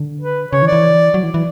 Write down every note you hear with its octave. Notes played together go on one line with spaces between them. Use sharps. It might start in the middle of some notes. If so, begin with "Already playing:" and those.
Already playing: D3
B4
C#3 C#5
E3
D5
E3
F#3
E3
E3